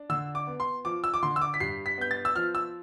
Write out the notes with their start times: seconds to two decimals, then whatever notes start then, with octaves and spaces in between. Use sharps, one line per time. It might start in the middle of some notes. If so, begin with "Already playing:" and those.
Already playing: D4
0.09 D3 E6
0.35 D6
0.47 B3
0.60 C6
0.85 F3 D6
1.04 E6
1.14 D6
1.23 D3 C6
1.36 E6
1.42 D6
1.54 B6
1.60 G2 C7
1.86 B6
1.98 B3 G6
2.11 A6
2.25 E6
2.36 F3 F6
2.55 E6